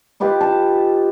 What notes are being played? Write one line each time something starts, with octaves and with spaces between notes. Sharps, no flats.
F4 G4 B4 D#5
A5